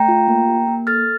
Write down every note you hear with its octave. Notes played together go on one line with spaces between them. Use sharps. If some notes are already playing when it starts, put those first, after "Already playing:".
Already playing: A3 G5 A#5
F4
A#3
G4
A#3
A4 F6 A6